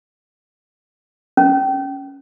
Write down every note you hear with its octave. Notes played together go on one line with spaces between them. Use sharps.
C#4